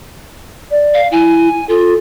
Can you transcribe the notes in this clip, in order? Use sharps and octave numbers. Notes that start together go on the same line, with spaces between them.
D5
F5
E4 G#5
F4 A4